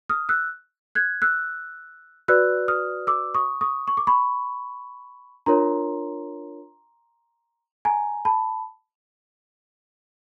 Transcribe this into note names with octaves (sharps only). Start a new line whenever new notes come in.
D#6 F6
E6 F#6
F#6 G#6
E6 F#6
F#4 B4 D5 E6 F#6
D#6 F6
D6 E6
C#6 D#6
C#6 D#6
C#6
D6
B5 C#6
D4 F4 A#4 C#5 A#5 C6
G#5 A#5
A5 B5